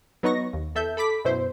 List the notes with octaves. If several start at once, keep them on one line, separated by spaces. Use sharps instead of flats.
F#3 B3 D#4 C#6 A#6
D#2
E2 A4 E5 G6
A4 B5 D6 B6
F#2 B2 E4 C5